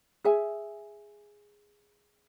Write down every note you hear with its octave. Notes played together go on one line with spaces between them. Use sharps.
G#4 E5 G#5